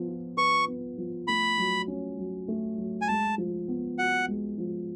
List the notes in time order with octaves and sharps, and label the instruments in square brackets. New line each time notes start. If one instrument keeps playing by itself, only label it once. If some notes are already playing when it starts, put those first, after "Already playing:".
Already playing: [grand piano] F3 B3
F4
[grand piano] B4 [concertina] C#6
[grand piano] B3
F3
[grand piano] A3 [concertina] B5
[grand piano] F#3
C#4
F#3
A3
F#3
[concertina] G#5
[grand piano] G#3 [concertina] A5
[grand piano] F3
B3
[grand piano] F#4 [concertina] F#5
[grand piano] G#3
F3